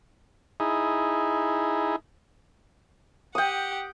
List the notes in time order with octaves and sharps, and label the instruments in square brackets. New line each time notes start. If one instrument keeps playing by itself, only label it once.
[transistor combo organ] D#4 E4 G#4
[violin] G4 F#5 [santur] G5 D#6